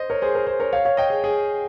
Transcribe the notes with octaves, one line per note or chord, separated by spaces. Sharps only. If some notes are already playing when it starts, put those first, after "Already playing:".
Already playing: C5 D#5
A#4 C#5
G#4 C5
A#4
G#4 C5
A#4 C#5
C#5 F5
C#5 F5
D#5 G5
G#4
G#4